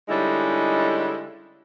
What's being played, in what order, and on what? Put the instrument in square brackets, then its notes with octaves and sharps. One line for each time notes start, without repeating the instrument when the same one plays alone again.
[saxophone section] D3 G3 G#3 C#4 D#4 E4